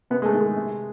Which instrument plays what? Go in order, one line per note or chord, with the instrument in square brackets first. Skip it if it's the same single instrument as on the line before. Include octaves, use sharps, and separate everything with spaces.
[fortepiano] C3 B3
G#3
A3
D#3
G#3
C3